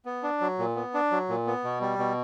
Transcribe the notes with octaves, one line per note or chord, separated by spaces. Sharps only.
B3
D4
F#3
A#2
B3
D4
F#3
A#2
B3
B2
G3
B2